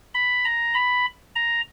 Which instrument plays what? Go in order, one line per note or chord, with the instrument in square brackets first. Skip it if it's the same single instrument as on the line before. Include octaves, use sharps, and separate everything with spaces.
[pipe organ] B5
A#5
B5
A#5